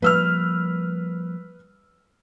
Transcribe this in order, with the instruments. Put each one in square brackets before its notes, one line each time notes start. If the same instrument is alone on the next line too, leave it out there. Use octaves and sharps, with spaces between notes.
[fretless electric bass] F3 G3 A#3 [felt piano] B4 E6 F6